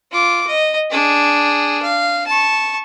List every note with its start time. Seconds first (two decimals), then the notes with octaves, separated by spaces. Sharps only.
0.12 F4 D6
0.47 D#5
0.91 D4 G#4
1.82 F5
2.27 A5 C#6